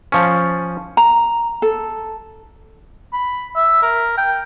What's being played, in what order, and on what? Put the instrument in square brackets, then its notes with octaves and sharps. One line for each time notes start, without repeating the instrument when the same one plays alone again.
[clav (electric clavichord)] F3 C#4
[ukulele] A#5
A4
[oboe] B5
E5
A#4
G5